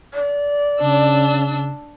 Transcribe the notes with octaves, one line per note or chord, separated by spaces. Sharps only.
D5
C#3 D4 E6